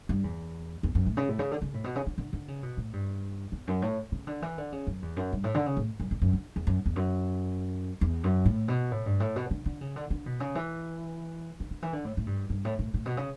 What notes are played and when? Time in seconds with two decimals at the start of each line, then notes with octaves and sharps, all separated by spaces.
0.09 G2
0.24 E2
0.83 E2
0.95 F#2
1.06 A2
1.17 C#3
1.29 A2
1.39 C#3
1.51 D3
1.62 C#3
1.74 A2
1.84 B2
1.95 C#3
2.07 D3
2.18 D3
2.33 D3
2.48 C#3
2.63 B2
2.77 A2
2.93 G2
3.52 E2
3.67 F#2
3.82 A2
4.12 C#3
4.27 D3
4.42 E3
4.58 D3
4.72 C#3
4.87 F#2
5.02 E2
5.16 F#2
5.33 G2
5.44 A2
5.55 D3
5.66 C#3
5.77 A2
6.00 F#2
6.11 E2
6.22 F#2
6.33 D3
6.56 E2
6.67 F#2
6.86 E2
6.96 F#2
8.01 E2
8.24 F#2
8.45 A2
8.68 B2
8.91 A2
9.06 G2
9.20 A2
9.36 B2
9.51 D3
9.66 D3
9.81 C#3
9.96 D3
10.10 D3
10.26 B2
10.40 C#3
10.55 E3
11.60 D3
11.71 D3
11.82 E3
11.93 D3
12.05 A2
12.17 A2
12.26 G2
12.50 G2
12.65 A2
12.79 A2
12.94 A2
13.06 B2
13.17 C#3